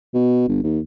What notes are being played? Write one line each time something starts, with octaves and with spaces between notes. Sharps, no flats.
B2
G1
D#2